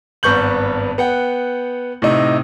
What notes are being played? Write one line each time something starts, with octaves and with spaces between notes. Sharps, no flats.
G#1 G2 B3 C#6 G6 F#7
B3 F#5 G5
A2 C3 D#4